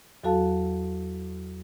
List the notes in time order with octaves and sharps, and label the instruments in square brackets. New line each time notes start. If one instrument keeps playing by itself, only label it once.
[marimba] E2 F#3 F#4 A4 F5 A5